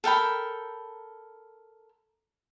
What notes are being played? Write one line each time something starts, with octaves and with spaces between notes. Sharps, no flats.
A4 A#4 G5 B5